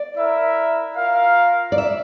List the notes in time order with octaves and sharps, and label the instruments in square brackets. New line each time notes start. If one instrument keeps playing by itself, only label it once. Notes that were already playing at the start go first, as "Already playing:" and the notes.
Already playing: [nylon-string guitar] D5
[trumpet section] E4 A#4 E5
F4 A#4 F5
[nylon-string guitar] D5
E5